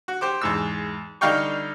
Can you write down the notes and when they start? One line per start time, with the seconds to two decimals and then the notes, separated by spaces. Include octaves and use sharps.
0.08 F#4
0.21 G4 C5 D6
0.41 E2 G#2 E6
1.21 D3 G3 D#4 F5 G5 C#6